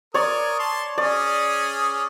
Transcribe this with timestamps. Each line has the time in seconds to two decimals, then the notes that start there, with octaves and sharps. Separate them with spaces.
0.14 A#4 C#5 D5 D#6
0.59 A5 C6
0.98 C#4 G#4 D5 D#6